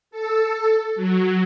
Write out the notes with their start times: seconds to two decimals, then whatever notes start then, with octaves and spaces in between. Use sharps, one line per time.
0.11 A4
0.96 F#3